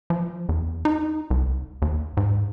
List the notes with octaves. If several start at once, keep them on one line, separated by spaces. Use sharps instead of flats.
F3
E2
D#4
C2
D#2
G#2